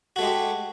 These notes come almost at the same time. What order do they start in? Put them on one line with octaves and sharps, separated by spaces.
F#4 A3 G#3 G4